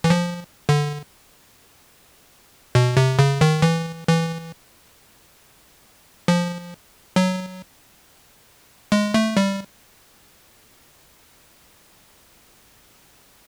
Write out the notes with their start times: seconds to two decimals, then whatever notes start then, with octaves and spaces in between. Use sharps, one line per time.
0.04 E3
0.10 F3
0.69 D3
2.75 B2
2.97 C3
3.19 C#3
3.41 D#3
3.62 E3
4.07 E3
6.28 F3
7.16 F#3
8.92 G#3
9.14 A3
9.37 G3